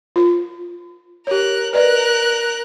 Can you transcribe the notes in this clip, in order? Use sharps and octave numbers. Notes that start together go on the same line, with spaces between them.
F4
G4 A#4 C#5 F#6
A#4 B4 D5 D#5 F#6